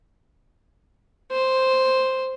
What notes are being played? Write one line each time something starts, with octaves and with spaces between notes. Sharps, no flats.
C5